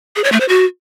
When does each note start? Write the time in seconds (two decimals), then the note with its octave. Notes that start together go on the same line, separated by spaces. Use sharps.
0.16 G#4
0.24 C#5
0.32 A3
0.40 C5
0.49 F#4